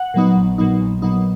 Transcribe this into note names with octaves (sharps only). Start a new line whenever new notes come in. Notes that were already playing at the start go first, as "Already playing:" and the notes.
Already playing: F#5
A#2 F#3 B3 D#4
A#1
A#2 F#3 B3 D#4
A#1
A#2 F#3 B3 D#4